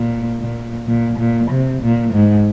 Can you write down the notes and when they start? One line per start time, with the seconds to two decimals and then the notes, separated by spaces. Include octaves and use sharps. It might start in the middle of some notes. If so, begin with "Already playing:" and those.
Already playing: A#2
0.40 A#2
0.87 A#2
1.19 A#2
1.50 C3
1.82 A#2
2.13 G#2